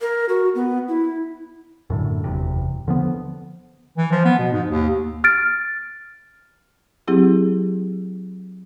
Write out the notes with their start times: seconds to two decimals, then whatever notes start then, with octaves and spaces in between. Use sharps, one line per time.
0.01 A#4
0.29 F#4
0.55 B3
0.89 E4
1.90 F#2 A2 D3
2.24 F#1 E2 C3
2.88 D3 F3 B3
3.97 E3
4.12 F3
4.25 B3
4.39 B2
4.52 G#2
4.68 D#2
5.24 F6 A6 D7
7.08 F#3 C4 E4 G4 G#4